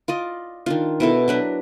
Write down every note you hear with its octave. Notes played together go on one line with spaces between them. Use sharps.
F4 D5 D#5
D#3 D4 F4
B2 E4 A4
F#3 D4 B4 A#5